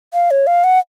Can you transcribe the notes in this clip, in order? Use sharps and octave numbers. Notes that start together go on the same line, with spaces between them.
F5
C#5
F5
F#5